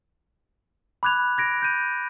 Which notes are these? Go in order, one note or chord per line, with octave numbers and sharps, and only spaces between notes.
B5 D6 F#6 G#6 F7
G#6 A#6 D7
G6 D#7